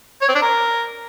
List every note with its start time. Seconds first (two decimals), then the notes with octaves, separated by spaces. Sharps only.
0.22 C#5
0.28 C4
0.35 D4
0.42 A#4